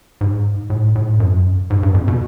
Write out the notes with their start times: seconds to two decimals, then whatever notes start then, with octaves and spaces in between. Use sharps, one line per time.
0.21 G#2
0.70 A2
0.95 A2
1.20 F#2
1.70 G#2
1.83 G2
1.94 F2
2.08 B2